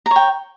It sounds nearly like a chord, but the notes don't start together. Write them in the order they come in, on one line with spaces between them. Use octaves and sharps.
A#5 C#5 G5